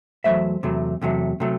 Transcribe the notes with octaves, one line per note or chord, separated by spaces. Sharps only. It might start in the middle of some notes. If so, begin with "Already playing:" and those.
E2 B2 F#3 A3 C5 E5
E2 C3 F#3 A3
E2 C3 F#3 A3
C3 F#3 A3